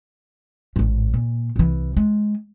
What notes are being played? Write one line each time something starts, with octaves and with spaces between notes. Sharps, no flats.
A1 G#2
A#2
C2 E3
G#3